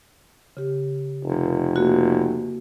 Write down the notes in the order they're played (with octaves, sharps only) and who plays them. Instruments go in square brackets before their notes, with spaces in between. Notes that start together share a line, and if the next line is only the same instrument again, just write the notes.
[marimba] C#3 G4
[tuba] F1
[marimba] A#3 E4 F#4